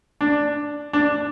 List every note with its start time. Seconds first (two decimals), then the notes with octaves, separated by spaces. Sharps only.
0.21 D4
0.93 D4